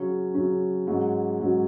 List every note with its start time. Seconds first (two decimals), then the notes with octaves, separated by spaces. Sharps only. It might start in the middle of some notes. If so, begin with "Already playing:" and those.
Already playing: C#3 F#3 C#4
0.34 C#3 F#3 C#4
0.87 G#2 F#3 C#4 F#4
1.40 G#2 F#3 C#4 F#4